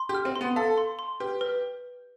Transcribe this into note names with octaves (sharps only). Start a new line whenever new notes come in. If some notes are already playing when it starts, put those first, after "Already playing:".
Already playing: C6
G4
F6
C4
C6
B3
A4 F5
C6
C6
G4 B4
B4